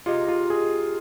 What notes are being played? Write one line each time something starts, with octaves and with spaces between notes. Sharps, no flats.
C3 G#3 D#4 F4
F4
G#4